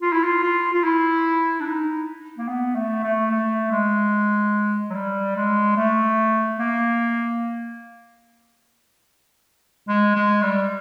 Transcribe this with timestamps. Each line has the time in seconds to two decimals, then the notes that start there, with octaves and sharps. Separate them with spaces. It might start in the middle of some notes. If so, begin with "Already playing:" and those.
0.02 F4
0.13 E4
0.24 F4
0.43 F4
0.73 F4
0.84 E4
1.60 D4
1.66 D#4
2.38 A#3
2.48 B3
2.75 A3
3.03 A3
3.31 A3
3.71 G#3
4.90 F#3
4.95 G3
5.36 G#3
5.77 A3
6.59 A#3
9.88 G#3
10.16 G#3
10.43 G3